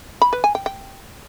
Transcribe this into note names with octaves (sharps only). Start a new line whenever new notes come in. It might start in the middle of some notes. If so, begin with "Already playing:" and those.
B5
B4
G#5
G5
G5